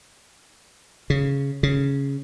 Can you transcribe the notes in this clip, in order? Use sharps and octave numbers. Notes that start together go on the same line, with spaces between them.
C#3
C#3